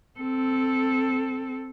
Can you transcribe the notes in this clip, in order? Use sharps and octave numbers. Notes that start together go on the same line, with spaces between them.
C4 A4